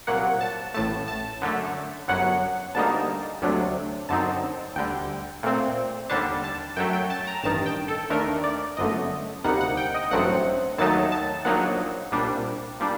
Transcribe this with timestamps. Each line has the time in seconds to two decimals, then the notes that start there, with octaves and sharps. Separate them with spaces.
0.07 C2 A#2 F#3 A#3 F#5
0.41 A5
0.74 A1 A2 A3 A5
1.08 A5
1.42 F#2 D3 A3
2.08 G1 F#2 F#3 F#5
2.75 D2 D3 G3 A#3 D#4 A5
3.41 D2 C3 F#3 A3 D4
4.09 F#2 D3 F#3 C4 D#4 A5
4.76 D2 D3 G3 G5
5.43 A#2 A3 C4
6.09 D#2 D3 G3 D4 A5
6.44 A5
6.77 F#2 F#3 A3 G5
6.93 G5
7.10 A5
7.27 A#5
7.43 A1 G2 D#3 A5
7.66 G5
7.88 A4
8.10 D#2 D#3 A3 D4 A#4
8.44 D5
8.77 G1 F#2 D3 A3 D#5
9.44 D2 C3 G3 A#3 D#4 F#5
9.61 F#5
9.77 G5
9.94 D#5
10.11 A1 G2 F#3 A3 C4 F#5
10.78 D#2 D#3 F#3 A3 D#4 A5
11.12 A5
11.45 A#1 A#2 F#3 A#3 D#4 F#5
12.12 C2 A#2 G3 D4
12.80 A#2 G3 D4